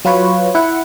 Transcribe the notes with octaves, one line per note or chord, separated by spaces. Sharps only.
F#3 F4 B4 C#5
E4 F#5